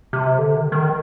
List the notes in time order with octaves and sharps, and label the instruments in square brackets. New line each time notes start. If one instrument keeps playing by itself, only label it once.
[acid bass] C3
D3
D#3
D#3